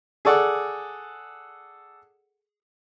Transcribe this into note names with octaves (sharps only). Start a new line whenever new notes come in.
G#4 A4 D5 F#5